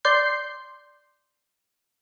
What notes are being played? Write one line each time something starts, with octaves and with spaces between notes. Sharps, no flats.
D5 C6 G6 C7